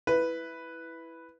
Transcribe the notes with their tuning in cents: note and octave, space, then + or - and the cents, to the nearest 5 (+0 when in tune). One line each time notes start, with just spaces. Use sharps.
E4 +0 B4 +0